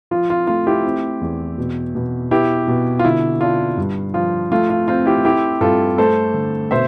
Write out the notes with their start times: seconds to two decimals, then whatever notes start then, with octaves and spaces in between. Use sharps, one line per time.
0.11 F3 F4
0.30 F4
0.47 A3 F4
0.67 E4 G4
0.84 C4
1.21 E2
1.58 B2
1.95 B2
2.31 B3 E4 G4
2.67 B2
2.99 F4
3.05 D3 E4
3.41 D4 F4
3.77 G2
4.14 F3 F4
4.52 A3 F4
4.70 F4
4.88 C4 F4
5.06 E4 G4
5.25 A3 E4 G4
5.61 G2 F4 A4
5.98 A3 A4 C5
6.34 D3
6.71 B2 C5 E5